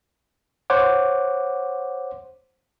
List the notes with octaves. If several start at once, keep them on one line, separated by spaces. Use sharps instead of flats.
C5 C#5 F#5 D6